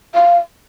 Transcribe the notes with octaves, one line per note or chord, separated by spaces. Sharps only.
F5